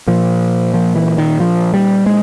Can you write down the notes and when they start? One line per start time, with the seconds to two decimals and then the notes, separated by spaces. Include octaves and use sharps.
0.07 A#2 F3
0.74 F3
0.96 E3
1.18 D#3
1.40 F3
1.74 G3
2.06 G#3